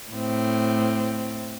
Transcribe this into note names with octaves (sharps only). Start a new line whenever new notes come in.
A2 C4